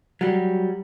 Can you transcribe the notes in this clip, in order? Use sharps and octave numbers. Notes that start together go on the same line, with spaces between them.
F#3 G3